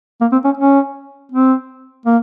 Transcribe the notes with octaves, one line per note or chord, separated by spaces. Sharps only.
A#3
C4
C#4
C#4
C4
A#3